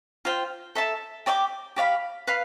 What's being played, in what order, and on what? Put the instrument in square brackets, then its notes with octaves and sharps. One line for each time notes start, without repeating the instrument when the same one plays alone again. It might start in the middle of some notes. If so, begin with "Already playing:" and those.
[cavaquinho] F4 C5 G5
A4 E5 A5
G4 D5 G5 D6
G4 D5 F5 B5
B4 F5